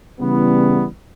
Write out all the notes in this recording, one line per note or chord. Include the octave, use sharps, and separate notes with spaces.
C#3 E3 G3 B3